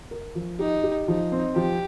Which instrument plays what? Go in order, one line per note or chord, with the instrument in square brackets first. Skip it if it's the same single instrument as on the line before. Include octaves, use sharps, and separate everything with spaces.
[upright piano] A#4
F3
[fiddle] D#4 [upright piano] G4
[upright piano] G4
[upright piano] F3 [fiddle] D#4
[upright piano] C4
[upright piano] F3 [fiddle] G4